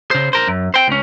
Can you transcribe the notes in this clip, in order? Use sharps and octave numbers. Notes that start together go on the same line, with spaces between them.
C#3 C5
A#4 C5
F#2
C5 G5
C#2 C#4